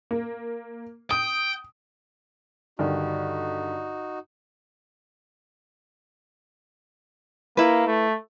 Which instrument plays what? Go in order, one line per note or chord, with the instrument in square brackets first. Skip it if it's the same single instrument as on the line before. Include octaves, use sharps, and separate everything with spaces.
[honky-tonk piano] A#3
[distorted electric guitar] G5 [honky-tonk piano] D#6
[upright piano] G2 D3 D#3 [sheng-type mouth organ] D#4 F#4
[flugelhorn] A#3 [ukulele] E4 B4
[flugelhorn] A3